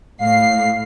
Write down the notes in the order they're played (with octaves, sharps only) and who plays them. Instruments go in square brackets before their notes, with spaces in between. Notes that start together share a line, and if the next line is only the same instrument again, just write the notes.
[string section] A2 C7 [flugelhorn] F5